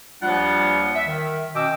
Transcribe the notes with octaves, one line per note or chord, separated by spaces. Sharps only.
D#2 F3 G3 D4 F4 F#5
E5
D#3
B2 C#4 D#5 G5 D6 E6